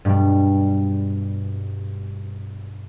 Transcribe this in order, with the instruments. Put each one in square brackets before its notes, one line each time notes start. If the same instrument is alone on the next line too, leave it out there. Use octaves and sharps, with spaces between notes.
[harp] G2 B2 G3